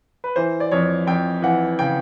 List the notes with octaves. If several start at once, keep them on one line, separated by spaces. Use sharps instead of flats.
B4
E3 C5
D5
F2 C#5
F2 G5
E3 F#5
C#3 G5